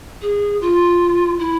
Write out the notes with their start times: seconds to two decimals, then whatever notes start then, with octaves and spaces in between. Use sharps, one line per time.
0.22 G#4
0.61 F4
1.39 E4